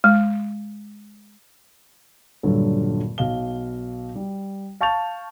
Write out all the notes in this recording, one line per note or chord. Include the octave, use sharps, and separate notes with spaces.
G#3
D#1 G2 D3 F#3 A4
B1 F5 G7
G3
F5 A5 C#6 G6 A6 F7